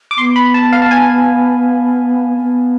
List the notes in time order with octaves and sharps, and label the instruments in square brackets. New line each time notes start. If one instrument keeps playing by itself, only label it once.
[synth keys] D6
[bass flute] B3 [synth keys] C6
[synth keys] B5
A5
F5
A5
G#5
[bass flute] B3